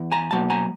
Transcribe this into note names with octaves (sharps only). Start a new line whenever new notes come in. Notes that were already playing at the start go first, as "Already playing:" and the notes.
Already playing: E2
G#5 A#5
B2 F#3 A#3 A5
G#5 A#5